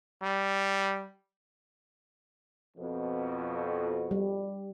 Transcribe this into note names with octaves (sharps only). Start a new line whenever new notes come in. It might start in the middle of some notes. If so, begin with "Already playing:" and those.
G3
F2 B2
G3